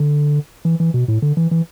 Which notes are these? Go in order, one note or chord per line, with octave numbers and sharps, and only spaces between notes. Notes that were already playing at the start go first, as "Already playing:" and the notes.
Already playing: D3
E3
E3
B2
A2
D3
E3
E3